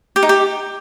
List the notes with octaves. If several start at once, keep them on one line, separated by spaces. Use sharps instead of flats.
G4
D#4
G4